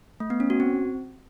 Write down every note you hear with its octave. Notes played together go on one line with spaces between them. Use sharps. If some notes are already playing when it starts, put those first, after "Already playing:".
A3
B3
C#4
F#4
C4